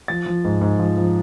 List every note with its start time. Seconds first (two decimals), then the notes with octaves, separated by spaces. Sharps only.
0.08 F3 A6
0.26 F3
0.45 G#2
0.61 G#2
0.79 F3
0.98 F3